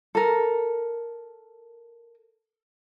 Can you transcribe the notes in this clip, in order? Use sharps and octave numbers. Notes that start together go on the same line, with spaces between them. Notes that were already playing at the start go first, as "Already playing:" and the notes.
A4 A#4